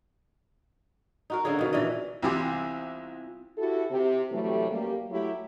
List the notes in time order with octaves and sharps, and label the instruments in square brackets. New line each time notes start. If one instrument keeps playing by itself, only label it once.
[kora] D#4 F#4 A#4
D3 A#3 C#4 G#4
B2 D#3
A#2 E3 D4 D#5
[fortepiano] C2 E3 G4 [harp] C4 E4 F4
[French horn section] E4 F#4 G4 A4
C3
C3 E3 F#3 G3 A3
F#2 G3 A#3 G4 A4
F#3 A3 E4 G4